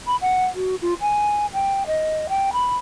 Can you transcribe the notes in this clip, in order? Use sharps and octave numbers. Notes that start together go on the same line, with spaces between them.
B5
F#5
F#4
F4
G#5
G5
D#5
G5
B5